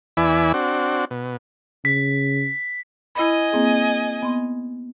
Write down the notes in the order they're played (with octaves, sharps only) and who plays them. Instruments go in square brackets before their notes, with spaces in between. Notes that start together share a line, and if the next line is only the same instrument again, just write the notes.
[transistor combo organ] E2 E3 D5 G#5 B5 E6
C4 D4 F#4
B2
[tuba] C#3 [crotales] B6
[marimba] E4 B5 [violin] D#5 G#5
[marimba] A#3 C4 G#4
B3 C6